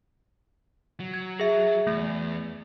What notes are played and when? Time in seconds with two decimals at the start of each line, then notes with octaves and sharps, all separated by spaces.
1.00 F#3
1.14 G#6
1.40 G#4 E5
1.87 E2 A3